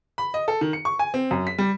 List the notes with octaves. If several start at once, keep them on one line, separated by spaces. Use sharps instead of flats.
B5
D#5
A4
D#3
C#7
C#6
G#5
C4
F#2
B6
G3